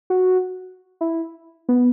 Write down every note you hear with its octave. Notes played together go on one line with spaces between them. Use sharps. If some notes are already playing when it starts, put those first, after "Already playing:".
F#4
E4
B3